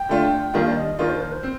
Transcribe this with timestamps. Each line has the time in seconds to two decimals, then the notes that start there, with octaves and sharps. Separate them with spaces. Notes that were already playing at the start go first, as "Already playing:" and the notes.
Already playing: G5
0.09 D3 A3 D4 F4
0.54 D#2 D#3 G3 D4 F4 F5
0.67 D5
0.76 D#5
0.98 D#2 D#3 A#3 F4 D5
1.10 C5
1.21 A#4
1.32 C5
1.43 C4